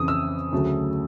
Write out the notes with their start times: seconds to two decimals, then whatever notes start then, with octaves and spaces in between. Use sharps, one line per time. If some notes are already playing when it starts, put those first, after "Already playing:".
Already playing: F2 C#3 E3 D#6
0.08 E6
0.52 D2 C#3 F#3 A3